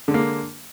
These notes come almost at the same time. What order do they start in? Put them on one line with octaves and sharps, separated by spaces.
D3 G#3 A#3